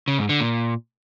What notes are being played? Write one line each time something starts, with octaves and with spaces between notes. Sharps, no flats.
C#3
G#2
D3
A#2